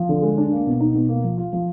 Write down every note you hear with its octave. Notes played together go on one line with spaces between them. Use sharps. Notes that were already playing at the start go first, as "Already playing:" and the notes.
Already playing: F3
D3
G#3
D4
A#3
B2
D#4
B2
A#3
F3
F4
F3